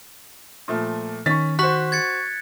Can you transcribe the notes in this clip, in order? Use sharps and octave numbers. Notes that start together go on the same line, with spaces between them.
A#2 F3 A3
D#3 C#4 C#6 A6 B6
F#4 C5 C#6 F#6 B6 F#7
G#6 A6 C#7